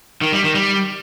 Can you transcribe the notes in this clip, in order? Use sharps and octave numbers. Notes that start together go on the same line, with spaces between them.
D#3
G3
D#3
G3